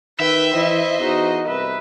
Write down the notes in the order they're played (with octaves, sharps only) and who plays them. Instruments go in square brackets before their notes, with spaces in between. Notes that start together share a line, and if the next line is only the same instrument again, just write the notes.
[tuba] D#3 [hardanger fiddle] B4 G5 [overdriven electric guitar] E5
[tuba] E3 [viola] E4 [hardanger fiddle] C5 D#5
[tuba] E2 [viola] D#4 F#4
[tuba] C2 [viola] B4 E5